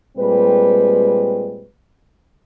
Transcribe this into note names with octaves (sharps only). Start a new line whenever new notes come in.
A#2 G3 G#3 C4 B4